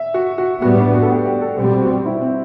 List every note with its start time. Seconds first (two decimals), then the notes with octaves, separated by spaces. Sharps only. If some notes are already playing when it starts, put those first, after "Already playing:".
Already playing: E5
0.14 F#4
0.38 F#4
0.62 A2 G3 B3 F#4
0.78 D4
0.94 F#4
1.02 A4
1.10 G4
1.26 G4
1.42 A4
1.58 B2 G3 C4 G4
1.81 F#4
2.06 E4
2.22 C4